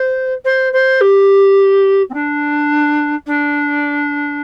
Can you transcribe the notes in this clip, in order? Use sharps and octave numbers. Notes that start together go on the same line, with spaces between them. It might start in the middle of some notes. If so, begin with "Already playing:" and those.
Already playing: C5
C5
C5
G4
C4
D4
D4